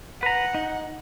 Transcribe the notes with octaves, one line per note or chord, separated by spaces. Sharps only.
B4 F#5 A#5
D#4